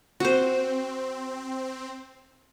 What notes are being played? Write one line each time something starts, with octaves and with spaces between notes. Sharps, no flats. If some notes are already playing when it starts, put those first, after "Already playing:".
C4 F#4 C5